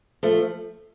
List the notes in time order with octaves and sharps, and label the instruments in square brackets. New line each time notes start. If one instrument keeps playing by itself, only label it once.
[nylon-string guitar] F3 A3